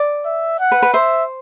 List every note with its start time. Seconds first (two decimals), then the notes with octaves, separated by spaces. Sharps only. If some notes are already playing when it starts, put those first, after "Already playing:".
Already playing: D5
0.25 E5
0.60 F#5
0.72 B4
0.82 B4
0.94 C5 E5